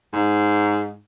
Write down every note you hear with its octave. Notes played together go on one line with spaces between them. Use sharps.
G#2